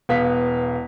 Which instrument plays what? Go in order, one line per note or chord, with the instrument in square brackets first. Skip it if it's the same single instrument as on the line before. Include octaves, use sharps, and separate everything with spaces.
[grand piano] E1 B3 F5 B6